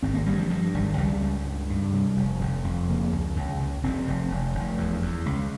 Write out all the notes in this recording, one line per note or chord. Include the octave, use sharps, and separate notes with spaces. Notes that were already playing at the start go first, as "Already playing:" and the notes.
G#1 C4
A#3
G2 G3
F3
G2 F3
G#1 G3
C#2 G3
C#2
G2
G2
C3 G3
F1
F1
F2
C#3 A#3
C#2
C#2
C#2
F1 C4
F1
F1
F1
E2
E2
C#2